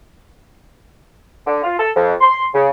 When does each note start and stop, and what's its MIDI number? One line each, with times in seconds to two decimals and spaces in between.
1.46 1.59 50
1.64 1.74 65
1.79 1.89 69
1.95 2.12 41
2.21 2.45 84
2.54 2.69 49